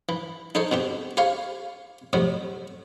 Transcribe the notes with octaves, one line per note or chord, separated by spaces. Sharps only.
E3
D#4 A4 C5 C#5
B2 C4 G4
G4 C5 C#5 F5
F2 A2 C3 F#3